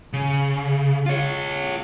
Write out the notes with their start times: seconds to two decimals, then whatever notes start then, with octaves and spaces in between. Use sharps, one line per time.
0.13 C#3
1.06 F4 C#5